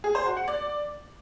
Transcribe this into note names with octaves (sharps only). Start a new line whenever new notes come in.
G#4
C5
F#4
F#5
D5